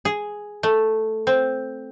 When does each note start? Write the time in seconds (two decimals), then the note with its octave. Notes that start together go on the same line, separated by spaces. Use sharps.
0.05 G#4
0.63 A3
1.27 C4